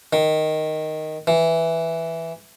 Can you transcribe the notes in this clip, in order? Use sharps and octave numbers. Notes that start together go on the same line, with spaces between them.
D#3
E3